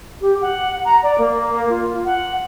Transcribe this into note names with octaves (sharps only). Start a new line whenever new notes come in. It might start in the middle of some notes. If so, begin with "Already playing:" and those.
G4
F#5
A#5
D5
A#3
F4
F#5